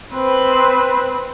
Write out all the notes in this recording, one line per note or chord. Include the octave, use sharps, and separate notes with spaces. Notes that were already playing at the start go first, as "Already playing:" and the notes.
C4 B4